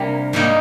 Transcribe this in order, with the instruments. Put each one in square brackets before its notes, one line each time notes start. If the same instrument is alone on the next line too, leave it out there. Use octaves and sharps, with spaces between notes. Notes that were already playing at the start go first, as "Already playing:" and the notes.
Already playing: [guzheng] C3 G3 A#3 D4
G#2 G3 A#3 D#4